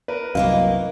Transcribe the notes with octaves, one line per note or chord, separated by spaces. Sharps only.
A#4 B4
C2 F#2 D#3 E3 A#3 F5